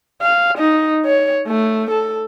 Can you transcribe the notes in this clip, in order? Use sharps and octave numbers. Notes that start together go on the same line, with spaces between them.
F5
D#4
C#5
A3
A4